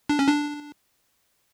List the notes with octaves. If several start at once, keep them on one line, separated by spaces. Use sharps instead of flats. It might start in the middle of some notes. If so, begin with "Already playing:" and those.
D4
C#4
D4